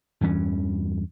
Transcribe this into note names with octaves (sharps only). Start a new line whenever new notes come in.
E2 G2 E3 C#4